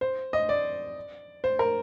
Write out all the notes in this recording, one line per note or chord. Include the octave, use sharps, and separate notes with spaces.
C5
D#5
D5
C5
A#4